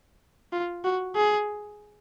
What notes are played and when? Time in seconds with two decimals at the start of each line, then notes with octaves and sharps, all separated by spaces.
0.53 F4
0.84 F#4
1.16 G#4